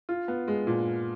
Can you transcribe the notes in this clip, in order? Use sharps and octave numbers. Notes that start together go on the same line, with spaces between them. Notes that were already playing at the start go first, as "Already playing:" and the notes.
F4
B3
G#3
A#2